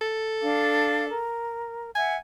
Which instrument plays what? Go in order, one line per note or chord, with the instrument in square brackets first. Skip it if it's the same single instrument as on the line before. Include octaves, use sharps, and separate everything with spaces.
[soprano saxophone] A4
[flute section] D4 F5 D6
A#4
[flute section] E5 F#5 [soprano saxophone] G#5